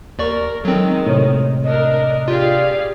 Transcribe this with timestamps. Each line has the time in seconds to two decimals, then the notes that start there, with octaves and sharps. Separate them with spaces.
0.19 D#2 A#4 D5 C#6
0.65 D#3 F#3 G#3 C4
1.06 A2 C3 C#5
1.64 D4 A#4 D#5
2.28 F4 G4 G#4 D5 F5